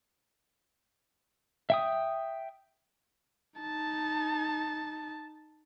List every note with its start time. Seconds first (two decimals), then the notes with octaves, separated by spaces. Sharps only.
1.70 E5 G5 D#6
3.60 D#4 A5